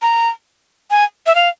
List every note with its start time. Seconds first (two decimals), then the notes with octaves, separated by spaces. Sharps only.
0.02 A#5
0.91 G#5
1.26 E5
1.35 F5